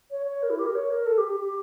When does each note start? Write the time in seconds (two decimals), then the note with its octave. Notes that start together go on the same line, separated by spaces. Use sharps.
0.10 C#5
0.26 C#5
0.42 A#4
0.50 E4
0.58 G4
0.65 A#4
0.75 C#5
0.90 A#4
1.06 A4
1.17 G4
1.28 G4
1.39 G4